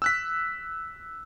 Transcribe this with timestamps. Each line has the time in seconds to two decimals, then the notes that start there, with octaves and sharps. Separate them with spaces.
0.02 E6 F#6 B6